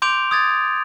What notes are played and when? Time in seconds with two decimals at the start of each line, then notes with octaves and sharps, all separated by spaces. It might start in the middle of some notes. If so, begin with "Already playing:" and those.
0.02 C6 D6 G6 D7 F7
0.31 D#6 G#6 A6